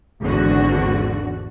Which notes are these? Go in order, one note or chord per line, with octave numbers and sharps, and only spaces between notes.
G#1 E2 D3 F#4